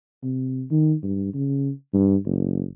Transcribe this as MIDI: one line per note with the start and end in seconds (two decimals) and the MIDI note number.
0.23 0.64 48
0.71 0.95 51
1.03 1.30 43
1.34 1.71 49
1.94 2.16 43
2.25 2.66 30